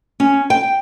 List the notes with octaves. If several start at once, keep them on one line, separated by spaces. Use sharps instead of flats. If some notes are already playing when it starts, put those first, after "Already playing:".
C#4
G5